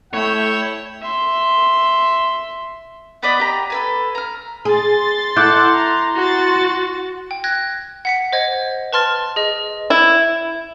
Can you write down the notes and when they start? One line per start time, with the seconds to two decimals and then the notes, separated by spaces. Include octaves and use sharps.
0.13 A3 E4 C#5 G5
1.02 E5 C6
3.23 B3 B4 D5 D#5
3.39 G4 A#5
3.70 A4 B4 G#5
4.15 A#5 F6
4.65 G#4 C6 A6
5.37 E4 A4 F#5 D6 F#6 G6
5.74 A#5
6.16 F#4 C6 A6
7.31 G5
7.44 F#6 G#6 A#6
8.05 F#5 B6 C#7
8.32 C5 D#5 G#6
8.93 B4 A5 C6 F6 A6
9.36 G#4 D#5
9.90 E4